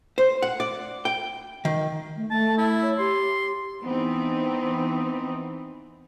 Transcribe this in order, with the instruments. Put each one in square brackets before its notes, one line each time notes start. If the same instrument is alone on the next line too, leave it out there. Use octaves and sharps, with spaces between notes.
[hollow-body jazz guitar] C5
F#5
D5
G5
D#3
[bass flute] A3
[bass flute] A3 [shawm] A5
[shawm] E4
[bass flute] C#5
[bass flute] G4 [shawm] C6
[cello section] E3 B3 C4 D#4